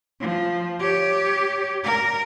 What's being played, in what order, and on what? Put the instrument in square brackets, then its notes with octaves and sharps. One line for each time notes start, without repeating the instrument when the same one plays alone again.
[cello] F3
G4 C#5
A#4